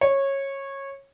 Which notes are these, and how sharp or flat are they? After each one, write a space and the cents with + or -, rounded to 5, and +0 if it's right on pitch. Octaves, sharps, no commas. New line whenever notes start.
C#5 -15